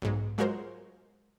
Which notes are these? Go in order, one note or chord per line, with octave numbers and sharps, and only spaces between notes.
B1 G#2
F#3 G#3 F4 F#4 A#4 C5